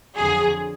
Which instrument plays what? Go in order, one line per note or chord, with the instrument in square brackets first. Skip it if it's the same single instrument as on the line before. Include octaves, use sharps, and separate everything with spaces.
[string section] F2 D3 F#3 G#4